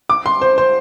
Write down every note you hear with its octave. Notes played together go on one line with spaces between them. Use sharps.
D6
C6
C5
C5